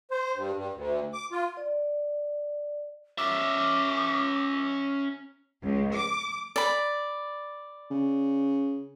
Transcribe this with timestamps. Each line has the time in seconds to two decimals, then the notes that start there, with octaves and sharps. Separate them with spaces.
0.11 C5
0.35 G2
0.55 G2
0.74 D2
1.13 D6
1.32 F4
1.57 D5
3.18 C#4 E5 D6
5.62 C#2
5.93 D6
6.56 D5 B5
7.91 C#3